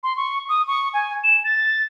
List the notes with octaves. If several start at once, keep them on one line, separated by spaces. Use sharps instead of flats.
C6
C#6
D#6
C#6
G#5
E7
A6